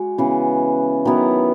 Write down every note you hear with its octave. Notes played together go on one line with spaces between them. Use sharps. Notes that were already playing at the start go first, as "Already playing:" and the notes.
Already playing: G#3 F#4
C#3 E3 B3
D#3 F#3 B3 E4